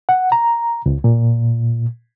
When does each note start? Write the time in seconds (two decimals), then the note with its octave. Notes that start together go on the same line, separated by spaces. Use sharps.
0.09 F#5
0.32 A#5
0.86 C#2
1.04 A#2